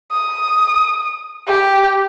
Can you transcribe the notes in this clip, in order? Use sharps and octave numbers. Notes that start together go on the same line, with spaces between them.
D#6
G4